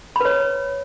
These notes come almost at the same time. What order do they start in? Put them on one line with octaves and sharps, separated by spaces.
B5 B4 C#5